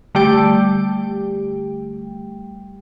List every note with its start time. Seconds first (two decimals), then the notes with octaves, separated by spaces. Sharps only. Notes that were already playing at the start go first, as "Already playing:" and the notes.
0.15 D3 G3 A3 G4 G5